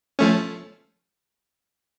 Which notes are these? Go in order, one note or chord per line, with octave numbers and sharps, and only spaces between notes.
F3 A3 C#4